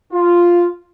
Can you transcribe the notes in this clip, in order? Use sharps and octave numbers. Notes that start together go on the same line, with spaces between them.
F4